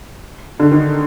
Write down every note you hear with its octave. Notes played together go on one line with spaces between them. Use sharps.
D3
D#3